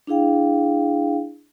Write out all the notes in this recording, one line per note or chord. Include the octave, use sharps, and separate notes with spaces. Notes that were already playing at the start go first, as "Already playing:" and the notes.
D4 E4 G#4 F5 G5